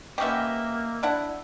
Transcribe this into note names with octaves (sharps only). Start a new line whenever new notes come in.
A#3 B3 C#4 G4 D#5 E5
D4 E4 F#5